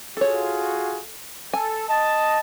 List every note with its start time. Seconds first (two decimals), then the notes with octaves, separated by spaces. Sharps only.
0.17 F4 F#4 G#4 A4 C#5
1.53 A4 G#5
1.89 D#5 A5